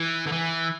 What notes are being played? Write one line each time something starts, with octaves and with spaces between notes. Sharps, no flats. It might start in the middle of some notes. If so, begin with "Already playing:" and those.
Already playing: E3
D3
E3